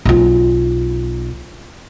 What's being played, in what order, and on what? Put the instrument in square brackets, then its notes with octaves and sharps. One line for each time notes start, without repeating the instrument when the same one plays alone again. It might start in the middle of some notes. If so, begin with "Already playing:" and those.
[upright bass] B1 F4